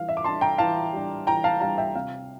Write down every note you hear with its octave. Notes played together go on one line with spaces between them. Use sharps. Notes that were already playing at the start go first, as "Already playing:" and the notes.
Already playing: E3 G3 D4 F5
E5
D6
G3 D4 A5 C6
G5 A#5
E3 F5 A5
G3 D4
E3 G5 A#5
F5 A5
G3 D4 F5 A5
E5 G5
C3 F5